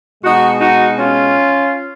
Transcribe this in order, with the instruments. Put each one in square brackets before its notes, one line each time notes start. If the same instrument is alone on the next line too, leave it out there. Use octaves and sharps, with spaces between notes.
[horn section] B2 G#3 D#4 F#4
D#4 F#4
C#4 F4